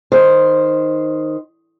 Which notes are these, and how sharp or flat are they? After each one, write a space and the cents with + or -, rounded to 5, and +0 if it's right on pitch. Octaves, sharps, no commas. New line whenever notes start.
D#3 +0 C5 +0